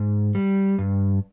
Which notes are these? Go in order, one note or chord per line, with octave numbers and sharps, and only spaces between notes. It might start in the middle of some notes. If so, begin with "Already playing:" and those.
Already playing: G#2
G3
G2